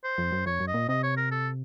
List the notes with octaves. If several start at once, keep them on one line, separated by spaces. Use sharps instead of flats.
C5
F2
F#2
F2 C#5
F#2
D#5
A#2
C3 D#5
C#5
A#4
A4